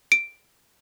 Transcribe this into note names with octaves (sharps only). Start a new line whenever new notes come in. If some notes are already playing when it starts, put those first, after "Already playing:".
D7